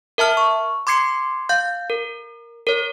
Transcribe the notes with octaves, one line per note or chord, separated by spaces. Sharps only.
A#4 E5 A5 F6
C#6
C6 D6 G#6 C7 C#7
F5 G6
A#4
A#4 C#5